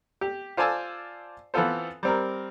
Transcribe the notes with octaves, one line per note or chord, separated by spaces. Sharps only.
G4
F4 C5 D5 G#5 A5 E6
E3 B3 C4 F4 A4 C5
G3 C4 A#4